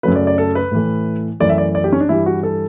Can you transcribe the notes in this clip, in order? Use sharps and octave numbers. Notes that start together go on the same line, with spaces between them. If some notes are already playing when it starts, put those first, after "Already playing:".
F#2 C#3 F#3 A3 B4
D5
D5
A4
B4
A2 E3 A3
F#2 E3 A3 D5
E5
D5
D5
G4
C#4
D4
G2 E3 G3 E4
F#4
A4